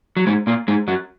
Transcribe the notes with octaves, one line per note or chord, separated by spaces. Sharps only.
F#3
G#2 G#3
A#2 A#3
G#2 G#3
F#2 F#3